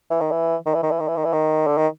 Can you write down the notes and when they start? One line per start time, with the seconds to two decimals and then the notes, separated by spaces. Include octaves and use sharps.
0.10 E3
0.21 D#3
0.31 E3
0.66 D#3
0.74 E3
0.82 D#3
0.90 E3
0.99 D#3
1.08 E3
1.16 D#3
1.24 E3
1.33 D#3
1.67 D3
1.77 D#3